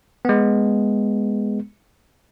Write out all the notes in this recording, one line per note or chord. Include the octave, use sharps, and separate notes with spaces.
G#3 B3